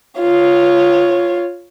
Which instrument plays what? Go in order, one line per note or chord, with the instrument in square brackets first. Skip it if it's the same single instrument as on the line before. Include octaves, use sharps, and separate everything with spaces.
[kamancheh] F4 C#5